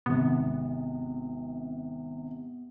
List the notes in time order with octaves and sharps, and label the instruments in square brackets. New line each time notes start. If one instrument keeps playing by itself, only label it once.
[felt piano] G#1 C3 [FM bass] B3